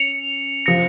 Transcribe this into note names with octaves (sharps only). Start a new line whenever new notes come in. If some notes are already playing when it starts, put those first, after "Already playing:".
Already playing: C#4 C#7 F7
F3 A#6 C#7